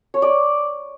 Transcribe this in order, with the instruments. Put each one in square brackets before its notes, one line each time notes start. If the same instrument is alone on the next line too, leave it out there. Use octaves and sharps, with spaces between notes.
[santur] C#5
D5